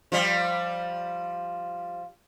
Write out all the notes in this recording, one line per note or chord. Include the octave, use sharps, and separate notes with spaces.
F3 G3